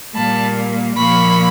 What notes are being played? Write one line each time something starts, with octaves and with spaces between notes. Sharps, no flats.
A#2 G3 A#3 A5 B5
A#2 F3 A#3 B5 C#6